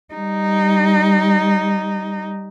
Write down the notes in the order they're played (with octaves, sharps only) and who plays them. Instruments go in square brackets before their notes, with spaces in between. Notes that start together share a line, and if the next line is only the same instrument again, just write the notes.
[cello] G3 D#4